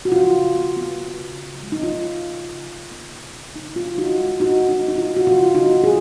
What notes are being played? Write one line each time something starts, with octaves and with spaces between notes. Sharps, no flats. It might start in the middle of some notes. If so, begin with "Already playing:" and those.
F#4
C#3 F4
C#3
B3
B3
B3
C#3
C#3
G#3
D#4
B3 F4
B3
C#3
C#3
C#3
B3
C#3
C#3
C#3 D#4
B3 F4
B3 D#4 F#4
G#3
B3 D#4 F#4
G#3
D#4
B3 D#4
F4
C#3
F#4
C#3 F4
C#3
D#4 F#4
B3
F4 G#4